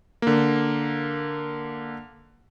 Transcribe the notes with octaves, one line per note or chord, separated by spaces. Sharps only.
D3 A#3